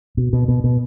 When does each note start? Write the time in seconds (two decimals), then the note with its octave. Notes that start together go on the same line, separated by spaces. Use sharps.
0.17 B2
0.33 B2
0.48 B2
0.64 B2